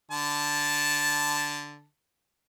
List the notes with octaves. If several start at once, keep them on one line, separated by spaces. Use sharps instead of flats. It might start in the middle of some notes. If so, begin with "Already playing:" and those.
D3 A5